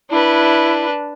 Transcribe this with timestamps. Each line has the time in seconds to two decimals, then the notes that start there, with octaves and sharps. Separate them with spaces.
0.11 D4 E4 B4